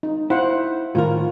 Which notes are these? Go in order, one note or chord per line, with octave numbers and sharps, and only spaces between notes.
D#4
E4 C5 F5 F#5
A2 D#3 F4 A#4